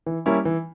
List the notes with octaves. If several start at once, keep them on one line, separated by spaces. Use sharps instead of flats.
E3
G3 A#3 C#4 E4
E3